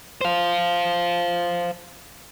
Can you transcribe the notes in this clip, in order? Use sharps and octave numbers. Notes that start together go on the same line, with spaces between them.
C5 F5